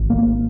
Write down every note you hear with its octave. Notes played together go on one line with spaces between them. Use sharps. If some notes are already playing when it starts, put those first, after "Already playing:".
Already playing: G#1
A#3